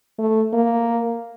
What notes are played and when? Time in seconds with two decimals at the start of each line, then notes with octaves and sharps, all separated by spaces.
0.19 A3
0.53 A#3